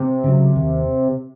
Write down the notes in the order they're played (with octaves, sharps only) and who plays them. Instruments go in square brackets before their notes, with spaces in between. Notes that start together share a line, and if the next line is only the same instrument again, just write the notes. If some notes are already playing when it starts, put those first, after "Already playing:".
Already playing: [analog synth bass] C3
[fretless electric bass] C#3 F#3
D#2